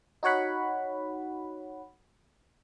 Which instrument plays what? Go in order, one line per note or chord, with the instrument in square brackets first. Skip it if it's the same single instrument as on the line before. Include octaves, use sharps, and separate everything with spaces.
[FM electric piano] D#4 F#4 C#5 F#5 B5